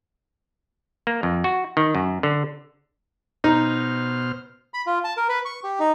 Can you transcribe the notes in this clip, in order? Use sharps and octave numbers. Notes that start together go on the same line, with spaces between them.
A#3
F2
F#4
D#3
F#2
D3
B2 D#4 C5 F6
B5
F4
A5
A#4
B4
C#6
G4
D#4